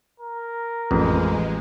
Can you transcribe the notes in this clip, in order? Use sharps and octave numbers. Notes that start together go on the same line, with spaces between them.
A#4
A1 F2 G#3